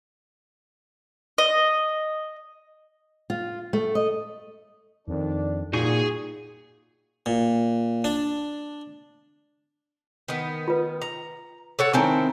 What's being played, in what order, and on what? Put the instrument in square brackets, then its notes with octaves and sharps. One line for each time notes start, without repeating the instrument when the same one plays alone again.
[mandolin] D#5
[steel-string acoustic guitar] F4
A3
D#5
[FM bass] F2 [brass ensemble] D#3 D4 D5
[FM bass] A#2 [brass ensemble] G3 [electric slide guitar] D#4 F#4 [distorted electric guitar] G#4 G#5
[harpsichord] A#2
D4
[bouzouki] D#3 B3
[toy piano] F4 B4
[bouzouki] A#5
A4 C#5 F#5
[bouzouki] D#3 C4 E4 [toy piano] D#4 G#5 E6